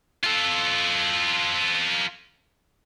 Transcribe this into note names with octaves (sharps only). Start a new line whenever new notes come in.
F4 A4